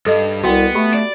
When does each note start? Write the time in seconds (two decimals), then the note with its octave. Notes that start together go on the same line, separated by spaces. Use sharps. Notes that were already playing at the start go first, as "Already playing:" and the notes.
0.06 G2 A4 D#5
0.44 C2 B3 F#4 F#5 G5
0.75 A3 G4 B5
0.94 D5